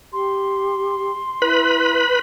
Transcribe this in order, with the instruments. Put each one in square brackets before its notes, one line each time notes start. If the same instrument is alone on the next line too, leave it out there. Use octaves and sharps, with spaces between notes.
[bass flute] G4 [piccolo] C6
[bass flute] E4 [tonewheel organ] B4 B5